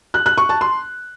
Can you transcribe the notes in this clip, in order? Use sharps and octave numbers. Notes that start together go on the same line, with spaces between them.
F#6
F#6
C#6
A5
C6